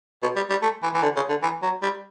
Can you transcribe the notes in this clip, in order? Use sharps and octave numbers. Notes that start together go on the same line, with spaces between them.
B2
G3
G3
A3
E3
E3
D3
C#3
D3
E3
F#3
G3